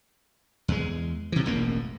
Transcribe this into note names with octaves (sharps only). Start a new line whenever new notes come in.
E2 G#3
C3 E3
E1 A1 F#2 A#3